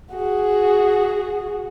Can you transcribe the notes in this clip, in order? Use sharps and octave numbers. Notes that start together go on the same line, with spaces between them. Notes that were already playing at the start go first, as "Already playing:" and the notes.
F#4 G#4